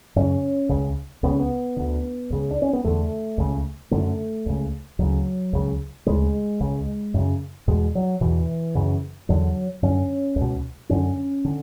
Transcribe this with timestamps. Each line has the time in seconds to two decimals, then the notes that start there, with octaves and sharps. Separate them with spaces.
0.16 F#2 C#3 C#4
0.69 C#2 C#3
1.23 C#2 C#3 B3
1.32 C#4
1.40 B3
1.77 D2 D3
2.30 C#2 C#3
2.51 D4
2.62 C#4
2.73 B3
2.84 E2 D3 A3
3.38 C#2 C#3
3.91 F#2 D3 A3
4.46 C#2 C#3
4.99 D2 C#3 F#3
5.53 C#2 C#3
6.06 D2 C#3 G#3
6.61 C#2 C#3
7.14 F#2 C#3
7.67 E2 B2 G#3
7.95 F#3
8.21 E2 B2 E3
8.75 F#2 C#3
9.29 E2 D3 F#3
9.83 F#2 D3 C#4
10.36 C#2
10.41 B2
10.89 F#2 D3 C#4
11.45 D3